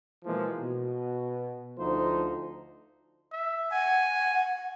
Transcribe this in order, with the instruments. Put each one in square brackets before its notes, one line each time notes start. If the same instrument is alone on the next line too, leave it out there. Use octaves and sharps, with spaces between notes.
[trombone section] B2 E3 F3 G#3 A#3
B2
D2 F3 A3 D#4 C5
[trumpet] E5
[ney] F#5 [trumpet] G#5